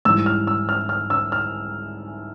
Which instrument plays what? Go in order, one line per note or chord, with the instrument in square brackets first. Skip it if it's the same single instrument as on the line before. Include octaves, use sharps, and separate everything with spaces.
[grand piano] G#2 E3 G3 E6
F6
E6
F6
F6
E6
F6